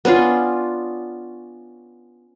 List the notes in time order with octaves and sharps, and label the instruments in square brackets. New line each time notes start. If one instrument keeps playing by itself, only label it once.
[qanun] B3 C#4 D4 F4